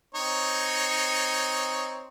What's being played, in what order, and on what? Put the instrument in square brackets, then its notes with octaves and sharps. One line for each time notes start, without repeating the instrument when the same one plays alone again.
[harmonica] C4 D#4 C#5